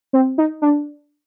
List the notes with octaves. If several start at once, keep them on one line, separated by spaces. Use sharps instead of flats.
C4
D#4
D4